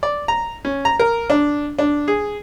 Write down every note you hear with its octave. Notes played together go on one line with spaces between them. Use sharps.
D5
A#5
C#4
A#5
A#4
D4
D4
G#4